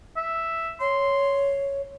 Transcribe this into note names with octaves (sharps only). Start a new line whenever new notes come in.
E5
C#5 C6